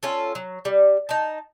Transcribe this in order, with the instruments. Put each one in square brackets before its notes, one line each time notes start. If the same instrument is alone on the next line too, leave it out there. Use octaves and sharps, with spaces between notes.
[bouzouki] C#4 F4 A4
F#3
G3
D#4 A5